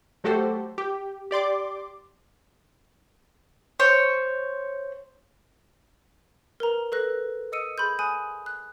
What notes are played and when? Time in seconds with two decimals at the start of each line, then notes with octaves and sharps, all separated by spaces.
0.24 F#3 A3 F#4 G4 A4 C5
0.78 G4
1.31 G4 D5 C6 D6
3.80 C5 C#5
6.60 A#4 B4 A#5
6.92 A4 B4 F#6 A#6
7.52 D#5 D#6 E6 C#7 D#7
7.78 G#4 B5 C6 G6
7.99 G#5 B5 D#6 F#6 D#7
8.46 F#6